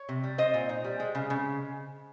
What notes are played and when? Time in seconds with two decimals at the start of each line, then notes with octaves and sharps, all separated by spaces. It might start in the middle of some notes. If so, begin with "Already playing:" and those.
Already playing: C#5
0.09 C3
0.23 G3
0.38 C4 C5 D#5
0.54 A#2
0.69 D#4
0.84 G3
1.00 G#3
1.15 C#3
1.30 C#3